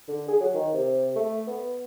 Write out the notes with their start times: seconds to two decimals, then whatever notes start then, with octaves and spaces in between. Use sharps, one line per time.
0.08 D3
0.28 G#4
0.40 F#3
0.54 D#3
0.74 C3
1.16 A3
1.47 B3